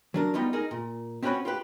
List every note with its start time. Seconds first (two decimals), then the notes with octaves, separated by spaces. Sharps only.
0.14 F#3 D4 A#4
0.34 G3 B3 D#4 F4
0.53 D#4 G#4 A#4
0.71 A#2
1.23 C4 C#4 F#4 G4 B4 C#5
1.45 F4 G4 B4